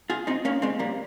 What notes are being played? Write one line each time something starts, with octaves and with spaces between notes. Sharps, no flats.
F4 G#4
C4 D#4
A#3 C#4
G#3 C4
G3 A#3